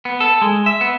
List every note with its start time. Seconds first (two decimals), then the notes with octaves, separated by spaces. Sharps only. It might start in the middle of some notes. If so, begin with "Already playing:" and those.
0.05 B3
0.20 A4
0.42 G#3
0.66 E5
0.81 B3